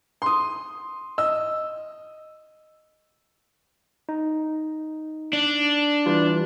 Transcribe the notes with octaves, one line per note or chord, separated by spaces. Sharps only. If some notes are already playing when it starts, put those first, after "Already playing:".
C6 D#6
D#5 E6
D#4
D4
E3 G3 F4